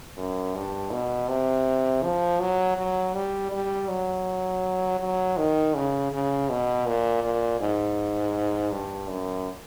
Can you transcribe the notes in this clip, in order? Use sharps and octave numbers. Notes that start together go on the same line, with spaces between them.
F#2
G2
B2
C3
F3
F#3
F#3
G3
G3
F#3
F#3
D#3
C#3
C#3
B2
A#2
A#2
G#2
G2
F#2